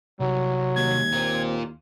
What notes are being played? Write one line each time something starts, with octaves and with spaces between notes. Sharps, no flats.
C2 F#3
D#2 G#6
C4 F4 A#4